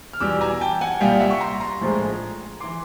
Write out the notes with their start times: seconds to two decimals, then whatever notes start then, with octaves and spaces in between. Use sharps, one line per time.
0.13 F6
0.20 E2 B2 G3 D6 E6
0.41 G#5 A#5
0.61 G5 A5
0.81 F#5 G#5
1.00 C2 A#2 G3 F5 G5
1.20 E5 F#5
1.31 C#6
1.41 A#5 C6
1.60 A#5 C6
1.81 A#1 A2 F3 G#3
2.60 E3 C6 D6